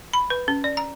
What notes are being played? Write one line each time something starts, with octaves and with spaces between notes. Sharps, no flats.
B5
B4
C#4
D5
A#5